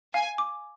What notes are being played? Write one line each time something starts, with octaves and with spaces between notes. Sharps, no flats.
F5 G#5
D6